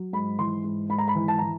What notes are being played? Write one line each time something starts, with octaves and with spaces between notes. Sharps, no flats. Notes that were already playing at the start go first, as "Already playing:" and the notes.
Already playing: F#3
G#2 B5
E3 C6
G#2
G#2 B5
A#5
B5
E3
A5
E3 A#5